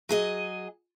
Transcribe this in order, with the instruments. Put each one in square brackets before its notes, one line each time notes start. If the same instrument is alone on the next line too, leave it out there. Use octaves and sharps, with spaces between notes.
[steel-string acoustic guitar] F#3 G#4 D#5